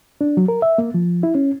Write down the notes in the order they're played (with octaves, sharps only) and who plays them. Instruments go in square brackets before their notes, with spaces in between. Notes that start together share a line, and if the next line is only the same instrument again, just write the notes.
[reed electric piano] D4
F#3
A#4
E5
A#3
F3
E4
C#4